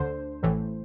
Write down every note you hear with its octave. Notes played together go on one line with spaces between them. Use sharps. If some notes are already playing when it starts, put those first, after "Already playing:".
Already playing: D2 D3 C5
A1 A2 E3